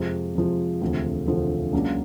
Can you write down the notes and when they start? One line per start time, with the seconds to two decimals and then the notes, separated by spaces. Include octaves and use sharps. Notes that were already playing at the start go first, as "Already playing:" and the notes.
Already playing: F2 C3 F3 G#3
0.35 F2 C3 F3 G#3
0.81 E1 D2 C3 F3 A3
1.27 E1 D2 C3 F3 A3
1.72 C#2 C#3 F#3 A#3 D4